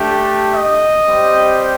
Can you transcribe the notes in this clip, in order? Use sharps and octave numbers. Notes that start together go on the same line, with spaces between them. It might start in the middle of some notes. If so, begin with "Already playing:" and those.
Already playing: A3 D4 G4
D#5
G3 C4 G4